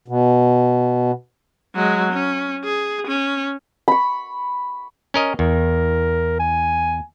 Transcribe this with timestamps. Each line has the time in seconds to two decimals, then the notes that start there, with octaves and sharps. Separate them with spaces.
0.08 B2
1.75 F#3 G#3
2.13 C#4
2.64 G#4
3.08 C#4
3.88 B5 C#6
5.14 C#4 A#4 D#5
5.39 E2 A#4
6.39 G#5